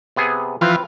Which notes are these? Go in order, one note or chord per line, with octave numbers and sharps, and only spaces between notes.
C3 B3 G#4
E3 F3 C4 F4 B4